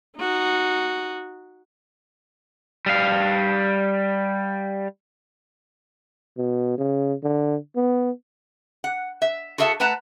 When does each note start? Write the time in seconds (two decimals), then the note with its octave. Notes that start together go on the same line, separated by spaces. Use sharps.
0.18 D#4 F#4
2.86 G3 F5
6.37 B2
6.78 C#3
7.23 D3
7.76 B3
8.84 F#5
9.22 E5
9.58 F#4 G#4 A4 E5 F5 A5
9.80 A3 B4 F#5 A5 A#5